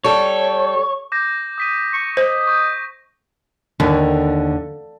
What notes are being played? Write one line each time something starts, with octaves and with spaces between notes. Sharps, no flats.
G3 A4 C#5
D6 G6 A#6
D#6 B6 D#7
C#6
C5 D#5
C#6 G6
D#2 D3